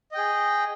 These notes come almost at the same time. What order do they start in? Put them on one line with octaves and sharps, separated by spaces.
D#5 G5 G#4